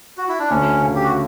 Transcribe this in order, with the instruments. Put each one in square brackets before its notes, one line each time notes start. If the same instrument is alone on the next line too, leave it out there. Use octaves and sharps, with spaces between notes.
[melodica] F#4
E4
D4
[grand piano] D2 [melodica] C#4
[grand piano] C#3
[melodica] G4
F#4